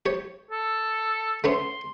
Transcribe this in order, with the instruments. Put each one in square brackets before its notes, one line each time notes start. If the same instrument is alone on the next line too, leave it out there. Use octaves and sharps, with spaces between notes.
[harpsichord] G4 C#5
[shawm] A4
[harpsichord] A3 B3 C#4 [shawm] C6